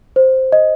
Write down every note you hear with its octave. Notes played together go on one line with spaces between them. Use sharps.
C5
D#5